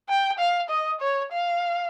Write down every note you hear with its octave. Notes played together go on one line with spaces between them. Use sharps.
G5
F5
D#5
C#5
F5